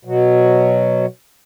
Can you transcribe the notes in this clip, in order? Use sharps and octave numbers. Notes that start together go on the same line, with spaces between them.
B2 F#3